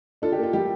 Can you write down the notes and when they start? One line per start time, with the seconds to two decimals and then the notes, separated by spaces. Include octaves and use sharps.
0.22 D4 F4 A4
0.32 G4
0.38 A#3
0.43 F4
0.53 G3 G4